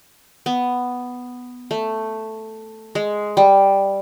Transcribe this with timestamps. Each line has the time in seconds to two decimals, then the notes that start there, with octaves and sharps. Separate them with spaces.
0.46 B3
1.71 A3
2.95 G#3
3.37 G3